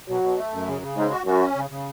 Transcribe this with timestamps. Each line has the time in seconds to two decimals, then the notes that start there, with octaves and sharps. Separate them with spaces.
0.09 B2 F#3
0.23 B2
0.38 A3
0.52 F#2
0.68 C#3
0.82 C#3
0.96 G#2 G#3
1.11 F#4
1.26 F#2 F#4
1.41 C#4
1.56 C#3
1.70 C#3